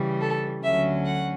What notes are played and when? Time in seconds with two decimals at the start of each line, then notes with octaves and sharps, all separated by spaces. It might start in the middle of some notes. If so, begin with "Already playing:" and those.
Already playing: C#3 E3 G3
0.21 A4
0.63 D2 D3 F#3 C#4 E5
1.05 F#5